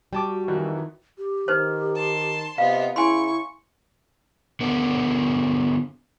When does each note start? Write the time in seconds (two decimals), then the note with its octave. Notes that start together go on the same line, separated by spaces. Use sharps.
0.13 G3 F#4 G5 A5 D6
0.48 F2 D#3 E3 F#3
1.18 G4
1.48 D#3 D#4 B4 C5
1.95 A5 C6
2.58 C3 B3 F4 D#5 F5
2.96 C#3 E4 G#5 C6 C#6
4.61 D3 B3 A#4